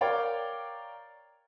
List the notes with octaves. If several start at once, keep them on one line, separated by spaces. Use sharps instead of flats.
A#4 C#5 D5 F5 G5